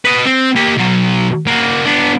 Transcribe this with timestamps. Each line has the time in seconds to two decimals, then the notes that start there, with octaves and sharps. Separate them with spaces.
0.05 B4 D#5
0.26 C4
0.56 A#3 G4
0.78 B2 F#3
1.47 A#3 F#4
1.85 B3 D4